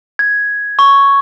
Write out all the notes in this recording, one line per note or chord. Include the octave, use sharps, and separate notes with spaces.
G#6
C#6